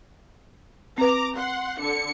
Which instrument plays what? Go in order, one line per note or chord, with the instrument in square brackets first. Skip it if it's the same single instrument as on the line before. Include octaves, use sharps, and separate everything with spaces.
[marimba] C4 B4 [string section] A#5 D6
[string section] F#5 C6
D3 C#7